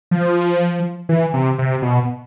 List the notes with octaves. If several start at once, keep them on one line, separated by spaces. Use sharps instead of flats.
F3
E3
C3
C3
B2